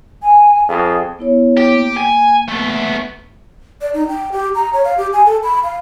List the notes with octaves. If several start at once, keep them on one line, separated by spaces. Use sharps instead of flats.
G#5
F2 G#4
B3 E4 C#5
G4
A#3
G#5
A3 B3
D5
D#4
G5
G4
A#5
C#5
F5
G4
G#5
A4
B5
F5